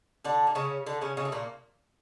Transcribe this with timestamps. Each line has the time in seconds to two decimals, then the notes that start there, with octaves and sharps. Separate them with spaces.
0.25 D3 D4
0.47 A#3
0.55 C#3 C#4
0.86 D3 D4
1.01 C#3 C#4
1.17 C#3 C#4
1.25 A3
1.32 A#2 A#3